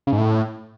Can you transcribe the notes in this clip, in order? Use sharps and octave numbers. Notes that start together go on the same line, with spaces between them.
C#3
G#2
A2